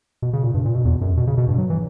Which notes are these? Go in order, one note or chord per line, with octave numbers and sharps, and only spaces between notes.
B2
C#3
A#2
G2
A#2
B2
E2
F#2
B2
C#3
B2
G2
F#3
E3